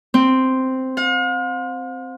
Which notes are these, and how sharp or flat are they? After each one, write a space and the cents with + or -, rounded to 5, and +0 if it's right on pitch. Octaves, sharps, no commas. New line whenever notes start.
C4 -5
F5 +45